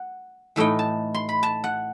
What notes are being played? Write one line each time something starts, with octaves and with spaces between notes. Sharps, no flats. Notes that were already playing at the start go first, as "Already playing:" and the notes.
Already playing: F#5
A2 E3 A3 D#4 G5
A5
C6
B5
A5
F#5